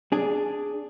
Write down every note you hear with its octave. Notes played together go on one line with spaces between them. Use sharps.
D4 G#4